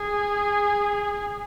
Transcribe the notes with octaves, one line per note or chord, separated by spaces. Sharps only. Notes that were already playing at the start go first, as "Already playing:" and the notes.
Already playing: G#4